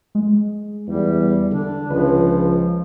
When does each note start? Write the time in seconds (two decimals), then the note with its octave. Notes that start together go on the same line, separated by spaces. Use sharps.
0.15 G#3
0.88 E2 G3
1.51 D3 D4
1.90 C#2 F3 B4